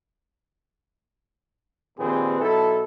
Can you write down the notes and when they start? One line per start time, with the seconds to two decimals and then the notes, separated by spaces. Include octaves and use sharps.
1.98 A#1 D#2 A#2 C4 G#4 B4
2.40 B1 B2 E4 A4